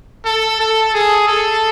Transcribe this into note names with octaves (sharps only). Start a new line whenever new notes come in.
A4
A4
G#4
A4